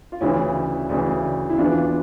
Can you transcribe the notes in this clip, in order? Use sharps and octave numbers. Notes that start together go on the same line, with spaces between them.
F4
D2 C#3 E3 C#4 E4
D2 C#3 E3
E4
E2 E3 D4 F4